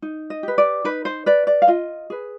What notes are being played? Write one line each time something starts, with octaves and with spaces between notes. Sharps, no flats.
D#4
D#5
G4 B4
D5
D#4 B4
C5
B4 D5
D5
F5
F4 D#5
G#4 B4